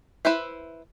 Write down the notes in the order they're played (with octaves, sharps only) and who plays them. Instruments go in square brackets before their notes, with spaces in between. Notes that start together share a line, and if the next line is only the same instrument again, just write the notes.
[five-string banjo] E4 B4 C5 E5